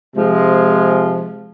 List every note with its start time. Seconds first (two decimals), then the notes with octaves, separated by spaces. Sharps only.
0.15 C3 F3 G#3